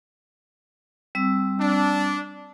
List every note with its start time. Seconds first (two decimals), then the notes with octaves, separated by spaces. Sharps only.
1.15 G3 C4 E6
1.59 D4